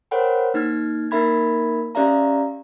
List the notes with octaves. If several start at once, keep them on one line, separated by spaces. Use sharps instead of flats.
A#4 C5 C#5 F#5 G5 B5
A#3 D#4 F6 G#6
A#3 D#4 A#4 E5 B5 G#6
C#4 G4 D5 E5 F5 A#5